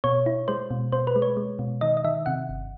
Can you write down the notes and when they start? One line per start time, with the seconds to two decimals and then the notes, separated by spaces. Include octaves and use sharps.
0.04 B2 C#5
0.26 E4
0.48 G#3 C5
0.71 B2
0.92 B2 C5
1.07 B4
1.16 G#3
1.22 C#5
1.37 G#3
1.59 B2
1.81 D#3 D#5
1.97 D#5
2.04 D#3 E5
2.26 C3 F#5
2.49 G1